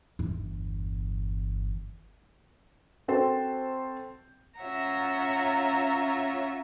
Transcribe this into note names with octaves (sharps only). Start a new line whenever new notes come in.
G1 E2
C4 F#4 A4 C5
C#4 F4 C#5 E5 F#5 A#5